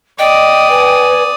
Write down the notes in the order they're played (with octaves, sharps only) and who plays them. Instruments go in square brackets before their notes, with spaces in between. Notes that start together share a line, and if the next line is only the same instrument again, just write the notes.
[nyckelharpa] D5 D#6 [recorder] D#5 [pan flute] G5
[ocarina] B4 [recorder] G#5